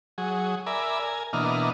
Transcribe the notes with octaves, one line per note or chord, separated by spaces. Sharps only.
F#3 G#4
A#4 D5 E5 G#5 B5
A#4 G#5
B2 E3 A#3 D4 D#5 F6